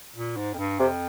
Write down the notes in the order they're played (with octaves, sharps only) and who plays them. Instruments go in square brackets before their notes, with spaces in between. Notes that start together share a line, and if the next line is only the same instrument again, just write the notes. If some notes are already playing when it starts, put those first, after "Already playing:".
[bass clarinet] A#2
G#2
F2
G2
[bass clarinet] F2 [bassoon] C3